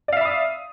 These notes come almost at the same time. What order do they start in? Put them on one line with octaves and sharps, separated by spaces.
D5 F5 E5 B5 D#6